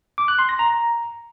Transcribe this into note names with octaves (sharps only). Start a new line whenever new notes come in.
D6
F#6
C6
A#6
A#5